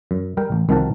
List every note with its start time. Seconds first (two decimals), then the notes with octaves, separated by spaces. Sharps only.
0.11 F#2
0.37 G3 A#4 G5
0.52 A1
0.69 C2 D#3 F3 F#4 A#4 A5